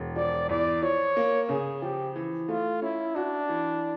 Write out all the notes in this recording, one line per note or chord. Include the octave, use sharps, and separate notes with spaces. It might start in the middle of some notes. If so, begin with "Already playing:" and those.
Already playing: E1
F3 D5
E2 D5
F3 C#5
A#3
C#3 G#4
F3 G4
E3
A3 F4
C#4 E4
D4 F#4
E3